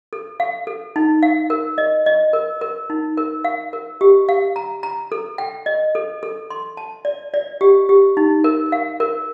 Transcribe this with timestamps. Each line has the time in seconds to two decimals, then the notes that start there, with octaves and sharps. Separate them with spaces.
0.13 A4
0.40 F5
0.67 A4
0.96 D#4
1.23 F5
1.50 A#4
1.78 D#5
2.06 D#5
2.33 A#4
2.61 A#4
2.90 D#4
3.17 A#4
3.44 F5
3.73 A#4
4.01 G4
4.29 F5
4.56 A#5
4.83 A#5
5.12 A4
5.38 G5
5.66 D#5
5.95 A4
6.23 A4
6.50 C6
6.77 A5
7.05 D5
7.34 D5
7.61 G4
7.89 G4
8.17 D#4
8.44 A#4
8.72 F5
9.00 A#4